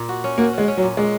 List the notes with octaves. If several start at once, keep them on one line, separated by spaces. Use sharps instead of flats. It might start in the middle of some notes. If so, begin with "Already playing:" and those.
Already playing: A#2
F#4
C#4
A#3 F#4
G#3 C#4
C#4
F#3
A#2
A#2 G#3